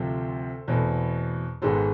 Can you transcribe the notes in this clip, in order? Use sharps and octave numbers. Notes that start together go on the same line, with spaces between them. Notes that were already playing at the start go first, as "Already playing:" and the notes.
Already playing: D2 C3 F3 A4 C5
E2 B2 A3 C4
G#1 G#2 G#3 B3 A4 C5